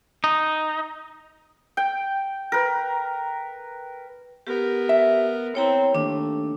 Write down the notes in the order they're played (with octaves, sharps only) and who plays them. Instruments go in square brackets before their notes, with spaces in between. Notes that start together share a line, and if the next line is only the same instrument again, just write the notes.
[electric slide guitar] D#4
[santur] G5
A#4 B4
[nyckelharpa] B3 A#4 [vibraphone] G4
[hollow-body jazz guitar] E5
[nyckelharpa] C4 E4 [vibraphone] C#5 G5 A#5
[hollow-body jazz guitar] D#2 [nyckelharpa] A3 [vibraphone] D4